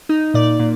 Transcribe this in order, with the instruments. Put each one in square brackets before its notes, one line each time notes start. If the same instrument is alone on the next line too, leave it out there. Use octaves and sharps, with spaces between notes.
[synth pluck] D#4
A#2 D5
A#2